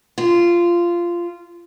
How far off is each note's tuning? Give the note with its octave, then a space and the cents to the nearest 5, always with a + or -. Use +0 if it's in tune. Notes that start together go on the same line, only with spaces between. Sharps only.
F4 -15